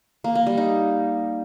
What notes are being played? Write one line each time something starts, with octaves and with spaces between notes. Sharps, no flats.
A#3
A#3
G3
D#4